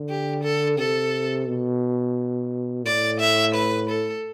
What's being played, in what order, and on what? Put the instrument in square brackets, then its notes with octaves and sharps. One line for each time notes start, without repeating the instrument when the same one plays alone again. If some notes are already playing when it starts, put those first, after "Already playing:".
Already playing: [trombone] D3
[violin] G4
A4
[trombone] C3 [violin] A4
[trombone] B2
[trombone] A2 [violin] D5
[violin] E5
B4
A4